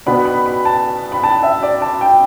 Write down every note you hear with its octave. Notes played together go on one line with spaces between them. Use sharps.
B2 B3 D4 B5
B5
B5
A5
B5
A5
E5
D5
A5
G5